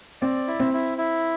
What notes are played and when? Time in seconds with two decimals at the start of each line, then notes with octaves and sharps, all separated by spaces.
0.21 C4 D5
0.48 E4
0.60 C4
0.74 E4
0.98 E4